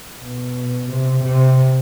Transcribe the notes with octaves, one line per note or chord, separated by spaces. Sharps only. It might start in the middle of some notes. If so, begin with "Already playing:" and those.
B2
C3
C3